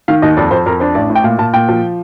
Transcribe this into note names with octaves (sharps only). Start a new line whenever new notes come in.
D#3 F5
D#2 D#5
F2 D5
F2 C5
F2 A#4
D4 C5
A1 D5
A2
G5
A#2 F5
A#2 A5
A#2 G5
F3